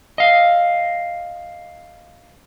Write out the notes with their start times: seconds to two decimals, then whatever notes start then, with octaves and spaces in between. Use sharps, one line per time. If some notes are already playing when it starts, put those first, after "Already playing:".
0.18 D#5 F5